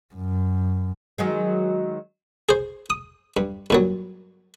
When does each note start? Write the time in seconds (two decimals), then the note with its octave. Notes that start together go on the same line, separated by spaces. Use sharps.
0.15 F#2
1.18 D#3 F#3 G#3
2.49 G#4 C5
2.90 D#6
3.37 G2
3.70 G2 A#2 F#3